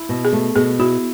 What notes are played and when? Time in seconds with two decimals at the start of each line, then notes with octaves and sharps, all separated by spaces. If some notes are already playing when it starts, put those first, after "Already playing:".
Already playing: E4
0.09 B2
0.25 G#4
0.33 A3
0.56 B2 G#4
0.79 E4 F#4